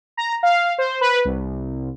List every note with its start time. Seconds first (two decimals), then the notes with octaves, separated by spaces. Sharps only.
0.17 A#5
0.43 F5
0.78 C5
1.01 B4
1.25 C2